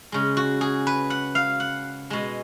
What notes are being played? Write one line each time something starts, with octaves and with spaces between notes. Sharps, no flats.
C#3 G#3
F#4
G#4
B4
F#5
F5
F#5
B2 G#3